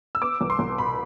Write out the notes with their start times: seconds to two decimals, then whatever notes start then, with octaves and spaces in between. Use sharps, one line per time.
0.15 E6
0.22 B3 D6
0.41 C2
0.50 C6
0.59 C2
0.78 B2 B5